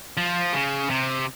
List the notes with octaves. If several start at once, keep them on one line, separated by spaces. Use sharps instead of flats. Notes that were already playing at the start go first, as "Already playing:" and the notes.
F3
C#3
C3